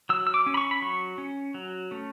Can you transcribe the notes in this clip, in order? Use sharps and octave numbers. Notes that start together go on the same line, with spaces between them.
F#3 E6
E6
D6
C#4
B5
C#6
B5
F#3 C#6
C#4
F#3
A3 C#4